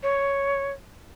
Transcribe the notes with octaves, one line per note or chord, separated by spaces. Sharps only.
C#5